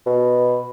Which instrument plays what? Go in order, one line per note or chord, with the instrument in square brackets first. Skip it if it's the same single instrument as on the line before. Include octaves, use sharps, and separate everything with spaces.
[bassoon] B2